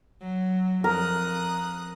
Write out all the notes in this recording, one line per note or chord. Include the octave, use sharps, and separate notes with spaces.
F#3
F2 A#4 D#6 F#6